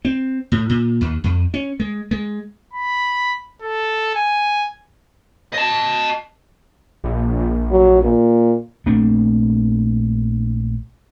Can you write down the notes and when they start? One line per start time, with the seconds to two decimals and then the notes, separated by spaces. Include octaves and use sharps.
0.05 C4
0.52 A2
0.69 A#2
1.01 D#2
1.24 F2
1.54 C#4
1.80 G#3
2.11 G#3
2.73 B5
3.61 A4
4.15 G#5
5.53 D#5 A5
7.04 A#1
7.71 F#3
8.03 A#2
8.86 A#1 A3 C4 D4